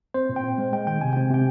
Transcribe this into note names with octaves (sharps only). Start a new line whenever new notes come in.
C4 C5
A#2
G5
C4
G#3
G#3 G5
D#3 G5
C3 G#5
C4 G5
C3 G5